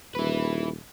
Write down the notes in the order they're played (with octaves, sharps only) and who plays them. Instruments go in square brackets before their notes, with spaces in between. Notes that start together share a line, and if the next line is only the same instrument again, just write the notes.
[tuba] D#1 [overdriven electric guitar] E4 B4